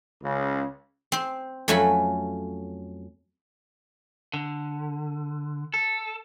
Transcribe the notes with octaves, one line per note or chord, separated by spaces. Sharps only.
C#2 C#3
C4 C5
F2 F#3 A3 C#4 G#5 B5
D3
A4